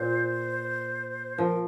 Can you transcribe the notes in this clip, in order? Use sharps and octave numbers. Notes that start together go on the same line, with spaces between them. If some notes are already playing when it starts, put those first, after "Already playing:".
Already playing: A#2 C5
F3 A#4